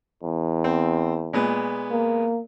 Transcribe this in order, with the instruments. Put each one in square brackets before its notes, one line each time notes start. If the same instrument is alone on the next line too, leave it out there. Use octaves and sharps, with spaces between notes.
[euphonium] E2
[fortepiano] C4
A#2 G#3 B3
[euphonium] A#3